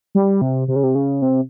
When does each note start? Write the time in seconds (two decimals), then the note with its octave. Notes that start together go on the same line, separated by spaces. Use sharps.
0.15 G3
0.41 C3
0.68 C3
0.76 C#3
0.83 C3
0.95 C#3
1.22 C3